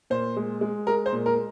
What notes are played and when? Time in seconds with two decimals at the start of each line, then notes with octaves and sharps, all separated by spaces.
0.10 A#2 C5
0.36 G#3
0.61 G#3
0.87 G#3 A#4
1.06 C5
1.13 A#2
1.26 A#4